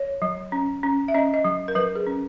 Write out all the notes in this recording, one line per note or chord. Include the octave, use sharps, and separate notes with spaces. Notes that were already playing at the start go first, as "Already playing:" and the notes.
Already playing: C#5
F#3
C#4
C#4
E5
C#4 D#5
D#5
F#3
A#4
F#3 B4
G#4
C#4